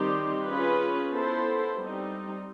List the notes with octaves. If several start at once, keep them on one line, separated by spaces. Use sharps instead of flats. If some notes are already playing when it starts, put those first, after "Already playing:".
Already playing: D#3 G3 C4 D#4 G4
C#4 F4 G#4 B4
B3 E4 A4 C5
G3 C4 D#4